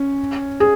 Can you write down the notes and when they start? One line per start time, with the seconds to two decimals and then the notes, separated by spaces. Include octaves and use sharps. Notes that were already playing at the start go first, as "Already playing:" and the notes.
Already playing: C#4
0.60 G#4